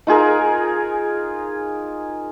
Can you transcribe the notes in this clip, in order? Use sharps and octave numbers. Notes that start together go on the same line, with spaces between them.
D#4 F4 G#4 A#4